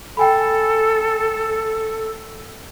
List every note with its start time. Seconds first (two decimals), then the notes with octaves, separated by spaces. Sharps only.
0.17 A4 G5 G#5 B5